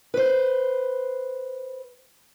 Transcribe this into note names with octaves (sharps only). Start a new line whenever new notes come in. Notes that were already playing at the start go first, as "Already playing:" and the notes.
B4 C5